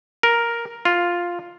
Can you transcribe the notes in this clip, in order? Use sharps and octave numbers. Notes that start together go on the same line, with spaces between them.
A#4
F4